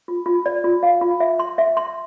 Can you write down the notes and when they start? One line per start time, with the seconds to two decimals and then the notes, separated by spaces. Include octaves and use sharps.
0.08 F4
0.26 F4
0.46 D5
0.64 F4
0.83 F5
1.01 F4
1.20 E5
1.39 C6
1.58 E5
1.77 C6